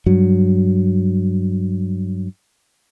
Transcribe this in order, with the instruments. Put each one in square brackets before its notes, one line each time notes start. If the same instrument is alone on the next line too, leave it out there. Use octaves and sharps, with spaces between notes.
[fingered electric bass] G2 F#3